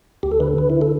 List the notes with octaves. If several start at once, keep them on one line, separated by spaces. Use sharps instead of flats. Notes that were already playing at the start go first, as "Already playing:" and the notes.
D2 G4
A4
D3 B4
D3 B4
E4
A4